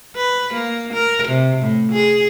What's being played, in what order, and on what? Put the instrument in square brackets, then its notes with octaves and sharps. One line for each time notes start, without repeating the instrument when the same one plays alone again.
[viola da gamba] B4
A#3
A#4
C3
A2
G#4